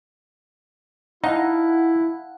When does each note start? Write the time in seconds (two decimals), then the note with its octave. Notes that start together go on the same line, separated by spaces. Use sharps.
1.24 D#4 E4 F5 F#5 A5 F6